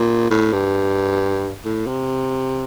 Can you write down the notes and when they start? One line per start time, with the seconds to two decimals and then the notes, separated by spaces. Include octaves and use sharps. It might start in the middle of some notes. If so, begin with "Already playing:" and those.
Already playing: A#2
0.30 A2
0.52 G2
1.65 A2
1.87 C3